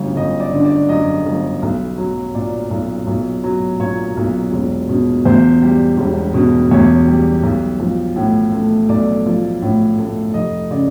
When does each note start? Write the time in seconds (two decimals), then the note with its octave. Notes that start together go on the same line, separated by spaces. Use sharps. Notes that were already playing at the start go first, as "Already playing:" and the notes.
Already playing: G1 F#2 D3
0.16 G1 D#5
0.40 D5
0.53 D3
0.65 D5
0.89 F#2 D#5
1.26 G1
1.62 B1
1.98 F#3
2.34 A#2 D5
2.70 B1
3.07 B1
3.44 F#3
3.80 A#2 C#5
4.17 B1
4.52 E1
4.89 B2
5.25 E2 C5
5.62 G3
5.97 E1
6.34 B2
6.71 E2 C#5
7.07 G3
7.43 B1
7.80 F3
8.16 A2
8.52 A3
8.89 B1 D5
9.26 F3
9.62 A2
9.98 A3
10.34 F1 D#5
10.71 C#3 D5